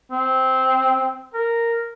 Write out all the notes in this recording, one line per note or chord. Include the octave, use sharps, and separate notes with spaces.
C4
A#4